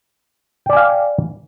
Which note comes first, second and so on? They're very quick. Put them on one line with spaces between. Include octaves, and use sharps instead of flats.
G5 D5 G#5 F5